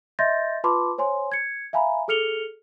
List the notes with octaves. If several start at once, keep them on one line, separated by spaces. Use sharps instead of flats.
D#5 E5 C6 G6 A6 A#6
F4 B4 A5 B5 C6 D6
C5 C#5 G#5 C6
G#6 C#7
E5 F5 G#5 A#5 B5
G#4 A4 F6 C#7 F7 G7